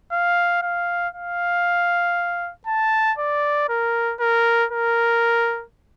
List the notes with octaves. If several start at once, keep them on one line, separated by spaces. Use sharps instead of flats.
F5
F5
F5
A5
D5
A#4
A#4
A#4